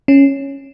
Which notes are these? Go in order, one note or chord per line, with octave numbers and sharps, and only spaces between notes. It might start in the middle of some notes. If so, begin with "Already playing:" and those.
C#4